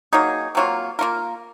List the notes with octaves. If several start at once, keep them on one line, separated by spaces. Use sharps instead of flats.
F#3 A#3 D#4 G#4
C3 F#3 A#3 F4
A#3 F4 A#4